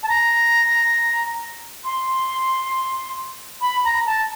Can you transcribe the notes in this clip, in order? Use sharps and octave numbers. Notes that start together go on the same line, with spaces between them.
A5
A#5
C6
B5
A#5
A5